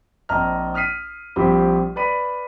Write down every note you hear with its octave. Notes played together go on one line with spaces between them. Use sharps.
A#1 C4 D#5 A5 A#5 F6
D#6 F6 B6 C7 D#7
A#1 F3 G3 C4 G4 B5
B4 D5 B5 D#7